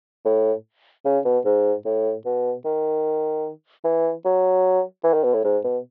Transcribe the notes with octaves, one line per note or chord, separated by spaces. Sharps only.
A2
C#3
B2
G#2
A2
B2
D#3
E3
F#3
E3
D#3
B2
A2
G#2
B2